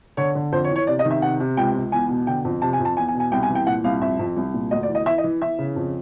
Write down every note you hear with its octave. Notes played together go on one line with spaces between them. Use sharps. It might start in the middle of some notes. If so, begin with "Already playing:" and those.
D3 C#5
D3
F2 C5
C#5
E3
C#5
C3 D5
D#5
D#3
E5
C3 F#5
C3
C#2 G5
C#2
E2 G#5
B2
D3 G5
F2
C3 A5
G#5
F2
A5
E2 G#5
G#5
B2
G#5
C2 G5
G#5
E3
G5
A#2 F#5
C2 F5
F2 E5
F2
C2
A#2
D2 D#5
D5
E3
D#5
E3 E5
D#5
E3
E3 E5
C#3
F2